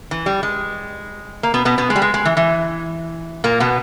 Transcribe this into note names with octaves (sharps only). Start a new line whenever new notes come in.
E3
G3
G#3
A#3
B2 B3
B2 B3
B2 B3
G#3
G3
G#3
G#3
E3
E3
A#2 A#3
B2 B3